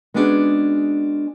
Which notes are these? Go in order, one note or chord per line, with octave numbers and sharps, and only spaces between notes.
G#3 B3 C#4 D4 F#4 G#4